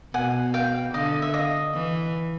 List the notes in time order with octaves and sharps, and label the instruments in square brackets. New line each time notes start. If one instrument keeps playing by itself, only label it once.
[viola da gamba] B2 [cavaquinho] F#5 G#5
[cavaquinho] F5 G5
[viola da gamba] D3 [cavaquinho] D#5 F5
[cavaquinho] E5
D#5 F5
[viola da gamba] E3